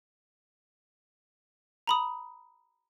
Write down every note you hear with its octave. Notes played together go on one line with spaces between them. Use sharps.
A#5 B5 D#6